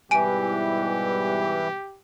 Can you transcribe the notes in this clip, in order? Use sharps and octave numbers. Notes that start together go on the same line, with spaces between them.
G#2 B2 E3 G3 G4 G#5 D7